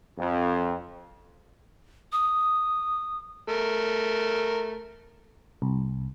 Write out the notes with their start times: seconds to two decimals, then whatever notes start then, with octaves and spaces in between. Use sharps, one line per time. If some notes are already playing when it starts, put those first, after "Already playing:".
0.18 F2
2.12 D#6
3.48 A3 A#4
5.62 C2